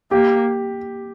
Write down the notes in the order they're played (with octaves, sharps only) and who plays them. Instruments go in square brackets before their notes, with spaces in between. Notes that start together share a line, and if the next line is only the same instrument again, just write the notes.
[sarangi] A#3 [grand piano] G4